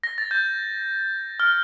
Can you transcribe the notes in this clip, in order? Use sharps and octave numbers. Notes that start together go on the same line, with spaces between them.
A#6
A6
G6
F6